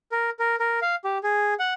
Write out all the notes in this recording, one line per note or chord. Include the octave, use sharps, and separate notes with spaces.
A#4
A#4
A#4
F5
G4
G#4
F#5